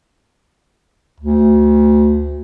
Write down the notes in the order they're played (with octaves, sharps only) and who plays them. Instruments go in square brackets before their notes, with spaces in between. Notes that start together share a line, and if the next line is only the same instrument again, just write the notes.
[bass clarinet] D2